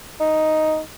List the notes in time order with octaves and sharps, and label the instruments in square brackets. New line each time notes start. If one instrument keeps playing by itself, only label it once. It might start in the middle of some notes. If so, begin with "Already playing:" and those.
[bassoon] D#4